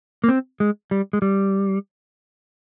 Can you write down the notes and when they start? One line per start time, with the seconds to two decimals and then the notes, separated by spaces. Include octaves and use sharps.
0.24 A#3
0.28 C4
0.60 G#3
0.91 G3
1.13 G#3
1.22 G3